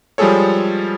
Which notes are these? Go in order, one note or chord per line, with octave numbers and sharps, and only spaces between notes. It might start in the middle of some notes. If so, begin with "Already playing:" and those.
F3 G3 G#3 G#4 A4 C#5